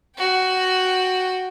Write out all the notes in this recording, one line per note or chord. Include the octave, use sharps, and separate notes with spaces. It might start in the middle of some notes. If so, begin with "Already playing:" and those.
F#4 G5